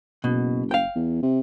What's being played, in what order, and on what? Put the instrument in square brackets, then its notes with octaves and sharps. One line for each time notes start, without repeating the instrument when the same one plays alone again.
[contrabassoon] F#1 [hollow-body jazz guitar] B2
[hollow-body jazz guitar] F5 G5
[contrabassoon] E2
C3